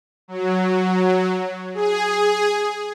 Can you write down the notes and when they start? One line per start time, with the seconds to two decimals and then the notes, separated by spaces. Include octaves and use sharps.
0.28 F#3
1.74 G#4